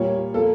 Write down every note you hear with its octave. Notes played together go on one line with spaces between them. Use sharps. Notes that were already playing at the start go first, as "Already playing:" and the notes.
Already playing: A#2 G3 A#3 C#5
F3 A#3 A4